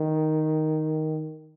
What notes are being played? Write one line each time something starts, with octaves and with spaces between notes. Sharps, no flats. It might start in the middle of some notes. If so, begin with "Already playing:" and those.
Already playing: D#3